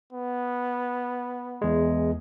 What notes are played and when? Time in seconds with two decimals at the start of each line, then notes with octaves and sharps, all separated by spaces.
0.13 B3
1.62 E2 G#3